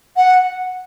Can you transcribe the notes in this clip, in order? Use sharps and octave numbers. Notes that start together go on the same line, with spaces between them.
F#5